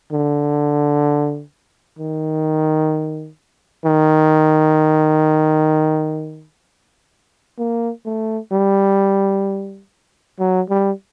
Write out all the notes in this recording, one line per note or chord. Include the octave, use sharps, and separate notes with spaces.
D3
D#3
D#3
A#3
A3
G3
F#3
G3